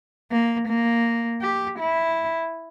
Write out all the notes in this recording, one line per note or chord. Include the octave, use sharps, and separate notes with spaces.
A#3
A#3
G4
E4